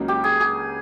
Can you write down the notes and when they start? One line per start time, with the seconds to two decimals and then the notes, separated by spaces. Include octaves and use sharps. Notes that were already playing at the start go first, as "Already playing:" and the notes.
Already playing: C#2 C#3 F#3 A#3 D#4
0.08 G4
0.24 G#4
0.40 G#4